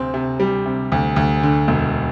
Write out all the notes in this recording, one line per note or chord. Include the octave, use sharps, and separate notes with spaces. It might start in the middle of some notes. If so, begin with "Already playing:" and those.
Already playing: D2 C3 C4
C3
G3
C3
D2
D2
D3
E1